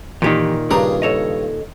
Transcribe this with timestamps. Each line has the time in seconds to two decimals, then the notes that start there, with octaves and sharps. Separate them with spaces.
0.22 A#2 D#3 E3 G4
0.71 G2 C#3 D4 G#4 A#5 D#6
1.02 A4 C#5 D#5